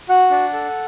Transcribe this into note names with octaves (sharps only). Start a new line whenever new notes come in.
F#4 F#5
D4
A4